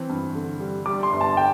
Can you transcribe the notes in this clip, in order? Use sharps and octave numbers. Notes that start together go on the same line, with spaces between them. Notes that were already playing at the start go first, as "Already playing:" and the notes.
Already playing: E3 C4
G2
D3
G3
G3 D6
C6
G1
A5
G5